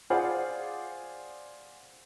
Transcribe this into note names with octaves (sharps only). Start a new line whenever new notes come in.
F4 G#4 C5 D5 F5 F#5